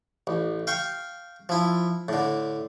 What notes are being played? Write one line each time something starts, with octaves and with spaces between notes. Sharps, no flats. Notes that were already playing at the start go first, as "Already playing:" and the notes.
A1
F5 G5 C#6
F3 E4
A2 D3